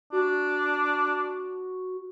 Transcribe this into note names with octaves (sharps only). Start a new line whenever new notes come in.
D4 F#4